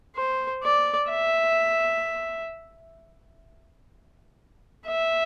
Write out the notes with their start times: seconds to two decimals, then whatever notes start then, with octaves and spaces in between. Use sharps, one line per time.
0.16 C5
0.63 D5
1.10 E5
4.87 E5